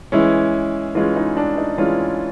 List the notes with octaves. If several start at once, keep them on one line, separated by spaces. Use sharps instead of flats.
E3 G#3 C#4 E4
E3 G#3 C#4 F4
D#4
D4
D#4
E3 G#3 C#4 F4